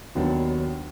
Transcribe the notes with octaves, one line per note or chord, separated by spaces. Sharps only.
D#2 D#3 F#3 B3 D4